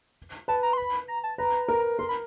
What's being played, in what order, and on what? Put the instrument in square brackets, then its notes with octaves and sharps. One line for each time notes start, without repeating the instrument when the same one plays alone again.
[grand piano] B4 [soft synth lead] A5
[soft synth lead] A#5
C6
B5
A#5
A5
[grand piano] B4 [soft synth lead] A#5
[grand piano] A#4
[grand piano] A#4 [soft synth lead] C6
[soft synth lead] B5